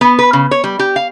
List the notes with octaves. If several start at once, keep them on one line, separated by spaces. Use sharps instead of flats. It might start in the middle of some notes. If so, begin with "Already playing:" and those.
B3
B4
C#3
C#5
G3
G4
F5